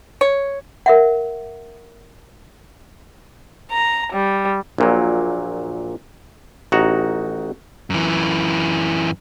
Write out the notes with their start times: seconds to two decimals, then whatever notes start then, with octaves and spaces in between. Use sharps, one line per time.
0.21 C#5
0.86 A#4 E5 F#5
3.71 A#5
4.12 G3
4.78 A#1 A#2 F#3
6.72 A1 D#4 F#4 A#5
7.90 F#2 E3